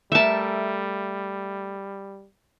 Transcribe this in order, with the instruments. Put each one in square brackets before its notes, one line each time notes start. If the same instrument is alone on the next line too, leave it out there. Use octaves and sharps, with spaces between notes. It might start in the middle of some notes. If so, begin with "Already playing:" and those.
[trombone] G3 [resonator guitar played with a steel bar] A3 A#4 [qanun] E5 A5